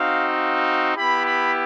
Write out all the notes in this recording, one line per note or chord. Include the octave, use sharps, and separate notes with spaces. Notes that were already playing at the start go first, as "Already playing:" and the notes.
Already playing: C4 D#4 F#4 F5
F5
B3 E4 G4 B5
B5